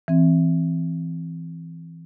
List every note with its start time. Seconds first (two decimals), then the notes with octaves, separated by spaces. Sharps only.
0.08 E3 C4